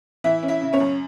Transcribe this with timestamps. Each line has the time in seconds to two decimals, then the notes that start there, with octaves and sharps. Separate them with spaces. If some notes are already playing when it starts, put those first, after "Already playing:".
0.24 E3 E4 E5
0.43 C#4
0.48 E4 E5
0.61 C#3
0.73 C#4 C#5
0.80 F#2